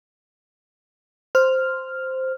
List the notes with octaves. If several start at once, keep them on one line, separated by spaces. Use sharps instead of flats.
C5 F6